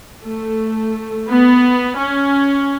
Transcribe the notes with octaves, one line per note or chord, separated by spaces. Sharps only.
A3
B3
C#4